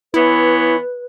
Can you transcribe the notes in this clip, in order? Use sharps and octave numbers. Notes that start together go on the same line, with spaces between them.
E3 B3 E4 B4 C#5